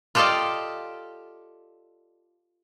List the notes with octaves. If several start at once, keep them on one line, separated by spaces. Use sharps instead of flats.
F4 G4 A4 D5 D#5 F5